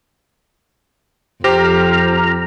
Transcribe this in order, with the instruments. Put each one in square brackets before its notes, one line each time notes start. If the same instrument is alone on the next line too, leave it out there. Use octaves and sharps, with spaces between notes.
[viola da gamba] F2 [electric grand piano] G4 C5 [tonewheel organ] A#5 F6